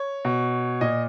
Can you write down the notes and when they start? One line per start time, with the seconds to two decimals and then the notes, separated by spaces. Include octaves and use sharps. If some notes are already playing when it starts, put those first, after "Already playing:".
Already playing: C#5
0.25 B2
0.81 A#2 D#5